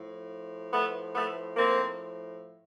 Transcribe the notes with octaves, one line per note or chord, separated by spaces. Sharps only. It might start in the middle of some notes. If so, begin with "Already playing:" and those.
Already playing: A2 F3
A3 B3
A3 B3
A#3 C4